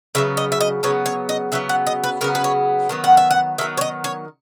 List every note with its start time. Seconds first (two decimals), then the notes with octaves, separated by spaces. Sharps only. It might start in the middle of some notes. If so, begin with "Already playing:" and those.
0.15 C#3 F#3 B3 E5
0.37 D#5
0.52 E5
0.61 D#5
0.83 C#3 F#3 B3 C#5
1.06 C#5
1.29 D#5
1.52 C#3 F#3 B3 E5
1.69 F#5
1.87 D#5
2.04 B4
2.21 C#3 F#3 B3 A#4
2.35 B4
2.44 C#5
2.89 D#3 F#3 B3
3.04 F#5
3.17 E5
3.31 F#5
3.58 D#3 E5
3.61 F#3 B3
3.77 C#5
3.81 D#5
4.04 C#5